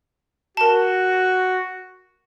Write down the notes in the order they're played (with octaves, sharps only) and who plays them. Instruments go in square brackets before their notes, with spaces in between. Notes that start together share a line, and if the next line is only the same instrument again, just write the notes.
[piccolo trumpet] F#4 [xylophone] A#4 A5